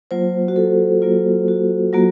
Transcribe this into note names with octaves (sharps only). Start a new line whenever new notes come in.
F#3 A#3 F4 C5
F#4
A4
F#3 A#3 F4
F#4
F#3 A#3 F4 F#4